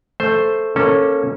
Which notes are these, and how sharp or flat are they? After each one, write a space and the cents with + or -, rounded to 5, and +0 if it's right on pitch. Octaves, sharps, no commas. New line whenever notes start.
A3 +0 C5 +0
A#3 +5 C#4 -15 A4 +0